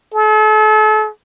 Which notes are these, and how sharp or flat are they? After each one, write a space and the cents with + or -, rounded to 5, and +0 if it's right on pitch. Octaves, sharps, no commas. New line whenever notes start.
A4 -40